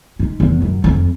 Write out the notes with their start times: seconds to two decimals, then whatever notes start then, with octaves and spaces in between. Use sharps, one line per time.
0.19 G#2
0.40 E2
0.62 F#2
0.84 F2